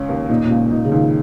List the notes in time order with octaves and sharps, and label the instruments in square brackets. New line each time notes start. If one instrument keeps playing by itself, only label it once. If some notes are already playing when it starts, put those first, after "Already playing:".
Already playing: [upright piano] C#2 C#4
D#2
[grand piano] A#2 [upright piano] D#4
[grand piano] A#2
[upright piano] C#2
[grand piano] A#2 [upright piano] D#4
[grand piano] C#3
[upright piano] C#2 [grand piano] D#3